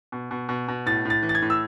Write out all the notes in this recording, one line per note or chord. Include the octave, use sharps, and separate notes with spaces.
B2
B2
B2
B2
A2 A6
A2 A6
E3
A6
G#6
A2
E6